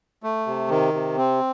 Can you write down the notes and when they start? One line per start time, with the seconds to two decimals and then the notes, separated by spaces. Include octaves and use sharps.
0.23 A3
0.47 C3
0.70 D#3
0.94 C3
1.17 C4